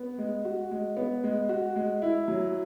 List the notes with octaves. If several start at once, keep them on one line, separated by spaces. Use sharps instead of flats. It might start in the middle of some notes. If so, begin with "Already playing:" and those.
Already playing: B3
G#3
F#4
G#3
B3
G#3
F#4
G#3
E4
F#3